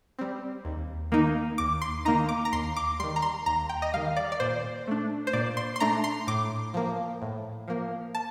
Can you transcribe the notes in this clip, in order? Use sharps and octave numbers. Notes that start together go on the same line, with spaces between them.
G3 C4
D#2
D#3 A#3 D#4
D#2 D6
C6
D#3 A#3 D#4 A#5
D6
A#5
D#2 C6
D6
D#3 G3 C6
A#5
C6
D#2 A#5
G5
D#5
D#3 G3 F5
D5
D5
A#2 C5
A3 D4
C5
A#2 D5
C6
C6
A3 D4 A#5
C6
A2 D6
F3 A#3
A2
F3 A#3
A5